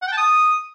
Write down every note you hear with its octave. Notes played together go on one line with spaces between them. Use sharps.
F#5
G5
A5
D#6